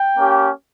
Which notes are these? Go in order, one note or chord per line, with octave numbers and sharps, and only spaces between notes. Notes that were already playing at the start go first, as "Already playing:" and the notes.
Already playing: G5
A#3 C#4 G4